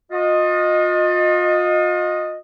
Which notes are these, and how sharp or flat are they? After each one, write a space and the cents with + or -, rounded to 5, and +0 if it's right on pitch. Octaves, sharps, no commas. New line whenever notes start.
F4 +40 D#5 -5